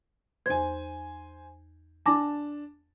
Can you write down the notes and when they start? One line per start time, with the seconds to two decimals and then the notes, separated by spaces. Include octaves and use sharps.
0.46 E2 C5 G#5 G#6
2.06 D4 G#5 A5 D6 A#6